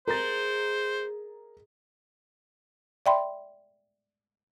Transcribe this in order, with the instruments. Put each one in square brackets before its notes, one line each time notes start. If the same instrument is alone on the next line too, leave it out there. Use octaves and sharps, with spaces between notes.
[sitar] G#3 [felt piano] A#4 A#5 A6 [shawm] C5
[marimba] D5 E5 G5 B5 C6